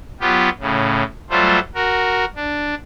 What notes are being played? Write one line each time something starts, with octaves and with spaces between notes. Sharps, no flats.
F#3 B3 F4 G4
A2 C#3
F#3 G3 A3 F4 C5
F#4 A#4
D4